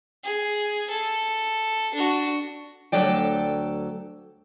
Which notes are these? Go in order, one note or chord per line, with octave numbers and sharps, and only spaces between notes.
G#4
A4
D4 F#4
D2 F#3 A4 D5 G5